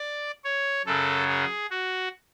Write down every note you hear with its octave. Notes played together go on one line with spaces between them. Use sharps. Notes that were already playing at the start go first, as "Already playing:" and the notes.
Already playing: D5
C#5
F#2 C#3 F#3 A4
G#4
F#4